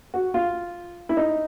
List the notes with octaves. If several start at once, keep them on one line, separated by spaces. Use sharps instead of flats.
F#4
F4
E4
D#4